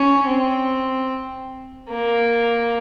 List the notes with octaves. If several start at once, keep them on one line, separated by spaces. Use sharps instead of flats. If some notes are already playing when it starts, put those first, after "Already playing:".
Already playing: C#4
C4
A#3